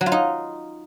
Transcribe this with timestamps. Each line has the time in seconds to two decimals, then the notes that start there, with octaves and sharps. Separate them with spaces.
0.01 F#3
0.06 F4
0.12 D#4